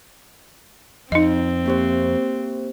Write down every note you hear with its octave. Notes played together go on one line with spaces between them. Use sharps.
F2 C4 D#4 D#5
A#3 G4 C5